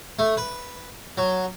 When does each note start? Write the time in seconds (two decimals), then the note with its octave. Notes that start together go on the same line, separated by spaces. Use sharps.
0.19 A3
0.37 B4
1.18 F#3